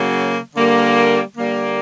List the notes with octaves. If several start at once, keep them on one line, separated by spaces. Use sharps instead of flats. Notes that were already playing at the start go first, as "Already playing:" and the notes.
Already playing: C#3 F#3 A#3
D3 G3 A#3
D3 G3 A#3